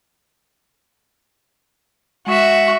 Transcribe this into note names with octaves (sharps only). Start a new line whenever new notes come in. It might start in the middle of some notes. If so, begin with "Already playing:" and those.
G#3 F#4 E5